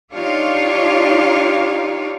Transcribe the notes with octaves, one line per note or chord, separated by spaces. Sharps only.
D4 D#4 F4 G4 C#5 F5